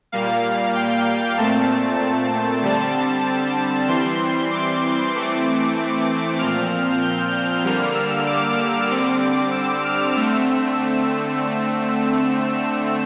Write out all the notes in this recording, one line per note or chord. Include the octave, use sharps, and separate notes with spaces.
A#2 G3 A#3 F5
G5
A#2 A3 C4 A5
D3 G3 C4 A5
E3 G3 C4 C6
D6
E3 A3 C4
A#2 F3 C4 F6
G6
F6
D3 G3 A#3 F6
E6
D6
D3 G3 C4
E6
F6
D3 A3 C4 E6